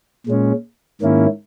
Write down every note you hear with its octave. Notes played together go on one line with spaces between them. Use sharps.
A#2 G#3 C#4
G#2 D#3 A#3 C#4 E4